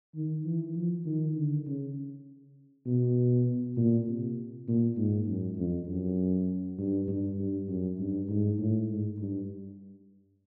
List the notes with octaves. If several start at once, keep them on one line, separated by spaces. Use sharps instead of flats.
D#3
E3
F3
D#3
D3
C#3
B2
A#2
C3
A#2
G#2
F#2
F2
F#2
G2
G2
G2
F#2
G2
G#2
A2
G#2
G2